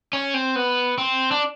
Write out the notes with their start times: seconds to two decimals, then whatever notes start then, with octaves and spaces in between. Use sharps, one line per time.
0.13 C#4
0.34 C4
0.56 B3
0.98 C4
1.31 D4